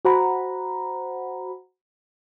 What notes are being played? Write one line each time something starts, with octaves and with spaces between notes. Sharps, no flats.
F#4 C5 F#5 A#5 B5